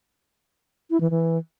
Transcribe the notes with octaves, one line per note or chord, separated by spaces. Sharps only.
E4
E3
E3